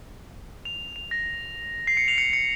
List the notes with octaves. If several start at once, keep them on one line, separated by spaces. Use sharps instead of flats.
F7
F7
A#6
C7
C#7
F7
C#7
C#7